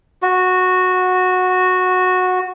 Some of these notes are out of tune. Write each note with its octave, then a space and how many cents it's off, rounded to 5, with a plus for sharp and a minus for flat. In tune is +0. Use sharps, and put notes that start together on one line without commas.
F#4 -10